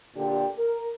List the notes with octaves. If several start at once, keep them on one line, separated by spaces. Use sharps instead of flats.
A#2 D3 G4
A#4